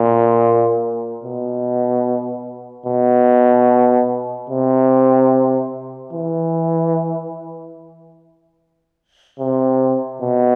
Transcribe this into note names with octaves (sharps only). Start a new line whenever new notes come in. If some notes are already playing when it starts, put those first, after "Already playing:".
Already playing: A#2
B2
B2
C3
E3
C3
B2